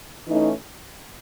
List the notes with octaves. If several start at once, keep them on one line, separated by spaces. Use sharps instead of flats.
E3 A3 C#4 D#4